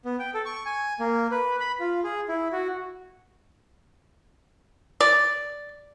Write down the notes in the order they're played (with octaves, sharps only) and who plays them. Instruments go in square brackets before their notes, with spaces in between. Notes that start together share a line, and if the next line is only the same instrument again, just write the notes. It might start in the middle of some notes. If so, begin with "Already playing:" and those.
[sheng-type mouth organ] B3
G5
A4
C#6
G#5
A#3
B4
B5
F4
G#4
E4
F#4
[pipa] D5